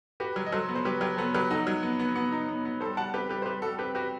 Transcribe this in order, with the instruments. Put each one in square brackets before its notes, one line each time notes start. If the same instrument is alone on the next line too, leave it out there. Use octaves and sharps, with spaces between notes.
[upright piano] F#4 [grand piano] G4 B4
[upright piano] F#3
[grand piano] D#5
[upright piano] F#3 [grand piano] A4 C5
[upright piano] B3
[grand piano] C5
[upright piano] F#3 [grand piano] G4 B4
[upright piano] F#3 [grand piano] G4 B4
[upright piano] B3 [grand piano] A4 C5
[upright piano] F#3 [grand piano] G4 B4
[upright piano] D#4 [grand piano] F#4 A4
[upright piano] F#3
B3
B3
B3
D#4
B3
B3
[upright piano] G3 [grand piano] A4 C5
[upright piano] G3 [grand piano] F#5 A5
[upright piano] C4 [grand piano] G4 B4
[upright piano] G3 [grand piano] G4 B4
[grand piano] C5
[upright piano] G3 [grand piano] G4 B4
[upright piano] G3 [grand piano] F#4 A4
[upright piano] C4 [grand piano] G4 B4
[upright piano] F#4 [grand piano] G4 B4